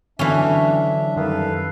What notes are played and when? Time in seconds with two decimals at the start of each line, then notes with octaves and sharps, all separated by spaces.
0.19 D3 E3 F#3 C#4 D4 E5
1.16 F#2 D#3 G3 A4 B4 F5